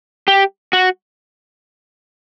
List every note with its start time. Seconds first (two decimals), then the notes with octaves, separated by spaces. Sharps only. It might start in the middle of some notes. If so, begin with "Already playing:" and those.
0.28 G4
0.73 F#4